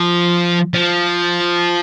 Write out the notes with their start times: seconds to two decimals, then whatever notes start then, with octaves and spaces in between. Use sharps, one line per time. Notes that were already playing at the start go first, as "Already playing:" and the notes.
Already playing: F3
0.74 F3